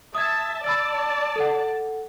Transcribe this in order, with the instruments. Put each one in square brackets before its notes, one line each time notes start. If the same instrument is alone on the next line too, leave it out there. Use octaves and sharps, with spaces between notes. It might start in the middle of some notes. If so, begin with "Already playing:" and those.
[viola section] E5 A5 [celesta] D#6 G#6
[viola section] D5 A5 [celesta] B5 E6 A6
[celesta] A4 F#5